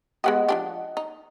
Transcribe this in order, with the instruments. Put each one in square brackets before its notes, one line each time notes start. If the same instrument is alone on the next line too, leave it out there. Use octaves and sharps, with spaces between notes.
[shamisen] G#3 B3 G4 [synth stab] D#5 F#5
[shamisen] F3 D4 G4
D#4